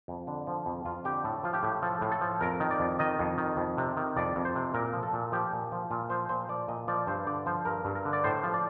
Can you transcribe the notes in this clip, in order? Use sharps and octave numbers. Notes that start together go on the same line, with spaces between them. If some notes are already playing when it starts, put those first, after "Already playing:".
F2
D3
F3
F2
F2 F4
D3 G4
A2 A4
F3 F4
G4
A2
F3 A4
A2
A4
F3
F2 A#4
D#3
D5
F2
D#3 D#5
F2
D#3
F2
C3
D#3
F2 D5
F2
C5
C3
A#2 A#4
F3
A4
A#2
F3 G4
A#2
F3
A#2 F4
F3 C5
A#2 C5
F3 D5
A#2 D#5
F3 D5
G2 C5
D3 D5
F3 C5
G2 A#4
G2
A#4
D3
D5
A2 C5
F3
D5